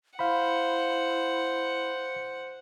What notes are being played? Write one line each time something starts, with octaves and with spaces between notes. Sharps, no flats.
E4 C5 F5 F#5 B5